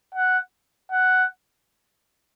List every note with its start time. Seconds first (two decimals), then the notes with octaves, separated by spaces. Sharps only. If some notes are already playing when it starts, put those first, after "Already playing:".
0.15 F#5
0.92 F#5